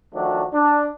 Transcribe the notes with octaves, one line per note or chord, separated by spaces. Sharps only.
D#3 F3 F#3 A3 D4 F#4
D4